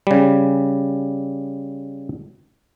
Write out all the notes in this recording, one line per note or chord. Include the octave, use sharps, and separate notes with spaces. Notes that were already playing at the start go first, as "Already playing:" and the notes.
C#3 G3